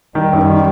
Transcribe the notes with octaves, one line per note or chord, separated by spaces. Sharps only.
D#3 G3
F#2
D#3